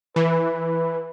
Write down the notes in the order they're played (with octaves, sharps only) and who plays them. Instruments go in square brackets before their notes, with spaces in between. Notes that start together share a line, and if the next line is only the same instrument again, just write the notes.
[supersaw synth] E3 [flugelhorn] B4